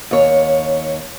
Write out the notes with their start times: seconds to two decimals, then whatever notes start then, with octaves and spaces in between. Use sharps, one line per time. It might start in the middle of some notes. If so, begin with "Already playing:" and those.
0.11 D#2 C#5